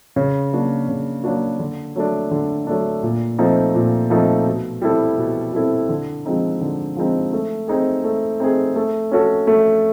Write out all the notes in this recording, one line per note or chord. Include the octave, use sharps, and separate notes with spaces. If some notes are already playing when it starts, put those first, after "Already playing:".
C#3
F#3 A#3 D4 F#4
C#3
F#3 A#3 D4 F#4
D3
F#3 A3 D4
D3
F#3 A3 D4
A#2
F3 A3 C4 D#4
A#2
F3 A3 C4 D#4
B2
G3 C4 E4 A4
B2
G3 C4 E4 A4
D3
F3 G#3 C4 D#4
D3
F3 G#3 C4 D#4
A3
C4 D#4 G#4
A3
C4 D#4 G#4
A3
C#4 F#4 A4
A3